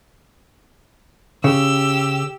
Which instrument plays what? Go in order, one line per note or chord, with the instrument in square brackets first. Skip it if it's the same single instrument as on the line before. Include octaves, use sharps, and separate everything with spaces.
[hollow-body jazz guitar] C#3 [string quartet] G4 E6